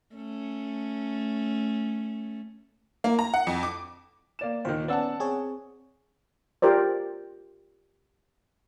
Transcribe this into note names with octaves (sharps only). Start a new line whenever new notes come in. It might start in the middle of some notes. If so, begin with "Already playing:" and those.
A3 C#4
A#3
A#5
F#5
F2
D6
A#3 D5 E7
D#2 A#2 D#3 C5
B3 C#4 D5 F#5 A5 E6
C4 G#4 C#5
F4 G4 A#4 C5 D5